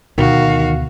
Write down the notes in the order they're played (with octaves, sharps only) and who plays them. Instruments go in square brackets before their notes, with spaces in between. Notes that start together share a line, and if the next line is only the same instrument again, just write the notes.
[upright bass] D2 B2 [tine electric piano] D#3 [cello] F#4 F5